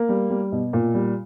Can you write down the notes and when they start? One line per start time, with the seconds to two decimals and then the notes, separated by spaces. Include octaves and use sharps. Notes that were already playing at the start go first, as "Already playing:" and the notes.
Already playing: A#3
0.09 G3
0.30 G3
0.52 B2
0.73 A#2
0.94 G3